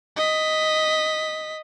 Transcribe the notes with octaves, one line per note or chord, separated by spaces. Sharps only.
D#5 B6